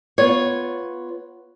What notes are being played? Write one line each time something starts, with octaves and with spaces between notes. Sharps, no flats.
B3 F4 C#5